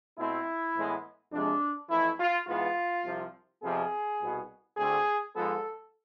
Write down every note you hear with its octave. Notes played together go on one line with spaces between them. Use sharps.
B2 A3 C4 E4
A2 E3 G#3 B3
F2 C3 F3 G#3 D4
F2 E3 A3 E4
F4
G#2 E3 B3 F4
C2 C3 F3
F2 C3 F3 B3 G#4
C2 B2 B3
D2 D3 A3 C4 G#4
G#2 F3 G#3 B3 A4